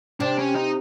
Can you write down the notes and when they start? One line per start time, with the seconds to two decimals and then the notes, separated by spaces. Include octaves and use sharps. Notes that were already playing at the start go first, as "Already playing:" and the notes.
0.20 C3 D4
0.39 C#4
0.55 D#4